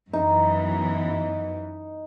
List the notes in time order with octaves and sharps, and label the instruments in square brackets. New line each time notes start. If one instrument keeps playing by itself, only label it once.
[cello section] F#2 E3 B3 [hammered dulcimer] D#4